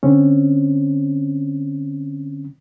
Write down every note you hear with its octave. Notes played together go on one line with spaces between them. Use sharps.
D3 C4 C#4